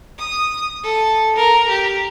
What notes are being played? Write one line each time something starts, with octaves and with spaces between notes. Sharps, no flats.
D#6
A4
A#4 A#5
G4